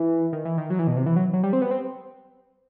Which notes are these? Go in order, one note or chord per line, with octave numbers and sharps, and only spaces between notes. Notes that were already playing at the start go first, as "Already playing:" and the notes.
Already playing: E3
D#3
E3
D#3
F#3
E3
B2
C3
E3
F#3
F#3
G3
C4
B3
C4